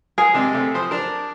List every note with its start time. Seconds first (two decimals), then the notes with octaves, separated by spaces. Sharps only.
0.18 G#4 A#4
0.34 C3 G#3 D4
0.53 C3 A3
0.74 F3 C5 D#6
0.91 D4 A#4